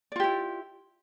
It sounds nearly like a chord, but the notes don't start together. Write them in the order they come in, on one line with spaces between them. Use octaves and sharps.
D5 F4 G4 E4